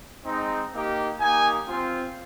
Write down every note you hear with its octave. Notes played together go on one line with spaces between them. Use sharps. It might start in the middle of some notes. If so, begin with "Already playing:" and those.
G#3 C4 D#4
A#3 D#4 G4
A#3 D#4 G4 G#5
C4 F4